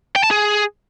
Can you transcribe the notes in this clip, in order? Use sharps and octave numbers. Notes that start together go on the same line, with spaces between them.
G5
A5
G#4